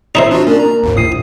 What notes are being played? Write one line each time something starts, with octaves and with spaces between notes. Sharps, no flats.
C4 D#4 E4 C5 D#6
D4 F4 F#4
A#3 C#4 D4 D5
A#5
G#1 D#2 G#2
A#1 D#6 C7 D#7